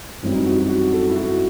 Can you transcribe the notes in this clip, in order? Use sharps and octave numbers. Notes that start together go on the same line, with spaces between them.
F#2 E3 G3 C4
D#4
F#4
F#4
F#4
A4
E4
F#4